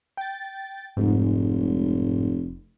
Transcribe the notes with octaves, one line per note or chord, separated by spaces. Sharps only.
G5 A6
F1 G#2